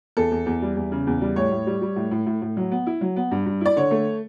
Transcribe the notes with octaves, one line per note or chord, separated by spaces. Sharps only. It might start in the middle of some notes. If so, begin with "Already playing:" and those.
E2 A4
E2
E2
G3
E2
C#3
E2
G3
A2 C#5
A2
G3
G3
A2
A2
A2
A2
F#3
B3
E4
F#3
B3
G2
G2
E4 D5
D3 C#5
A3